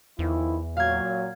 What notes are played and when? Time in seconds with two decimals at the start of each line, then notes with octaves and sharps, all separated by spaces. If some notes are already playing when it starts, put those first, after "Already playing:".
0.19 E2 D#3 F3 E4
0.77 A#2 F#3 F5 G#6